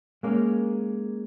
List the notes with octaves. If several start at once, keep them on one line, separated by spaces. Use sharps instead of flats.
G#3 A#3 C#4